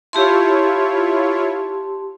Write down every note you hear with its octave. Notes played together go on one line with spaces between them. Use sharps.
E4 F4 G4 C#5 A5 C6